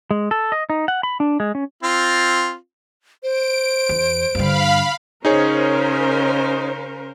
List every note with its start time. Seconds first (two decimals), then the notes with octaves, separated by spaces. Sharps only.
0.11 G#3
0.31 A4
0.52 D#5
0.70 D#4
0.88 F#5
1.03 B5
1.20 D4
1.40 G#3
1.55 C#4
1.83 C4 F4
3.23 C5 D7
3.89 E2
4.35 G2 D3 F5 B5
5.25 C#3 C#4 D#4 G#4 A#4 C5 C#5